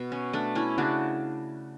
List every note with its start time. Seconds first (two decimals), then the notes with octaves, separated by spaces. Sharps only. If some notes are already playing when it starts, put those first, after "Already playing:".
Already playing: B2
0.12 C#4
0.33 A3 D4
0.55 C#4 E4
0.78 C#3 D4 F#4